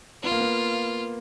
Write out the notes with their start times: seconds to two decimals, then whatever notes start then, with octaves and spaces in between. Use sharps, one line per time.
0.23 B3 F4
0.31 A#3
0.40 B3